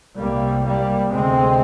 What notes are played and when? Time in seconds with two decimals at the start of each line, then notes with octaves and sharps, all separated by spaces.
0.18 C2 C3 G3 A#3
0.65 G3 A#3
1.12 D2 C3 G#3 C4